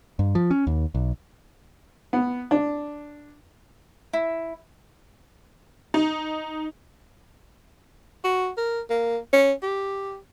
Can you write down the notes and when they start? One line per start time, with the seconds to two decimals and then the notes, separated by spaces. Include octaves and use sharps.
0.19 G2
0.35 F3
0.51 C#4
0.67 D#2
0.95 B1
2.13 B3
2.51 D4
4.13 E4
5.94 D#4
8.24 F#4
8.57 A#4
8.90 A#3
9.33 C#4
9.63 G4